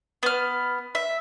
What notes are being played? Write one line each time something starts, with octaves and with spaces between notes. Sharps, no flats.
B3 F6
E5